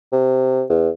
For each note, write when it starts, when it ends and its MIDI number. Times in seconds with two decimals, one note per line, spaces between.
0.13 0.63 48
0.69 0.89 40